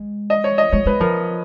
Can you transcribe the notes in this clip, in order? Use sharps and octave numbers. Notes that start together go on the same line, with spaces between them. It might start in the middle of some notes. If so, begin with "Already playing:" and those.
Already playing: G#3
D#5
C#5
D#5
G#3 C#5
G#3 B4
F3 A#4